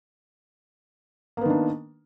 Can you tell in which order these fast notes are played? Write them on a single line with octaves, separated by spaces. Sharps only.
A#3 B3 D#3 D4